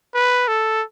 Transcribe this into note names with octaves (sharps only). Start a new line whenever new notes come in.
B4
A4